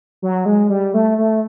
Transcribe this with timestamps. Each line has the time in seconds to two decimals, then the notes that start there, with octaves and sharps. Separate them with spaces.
0.22 F#3
0.46 G#3
0.70 G3
0.94 A3
1.18 A3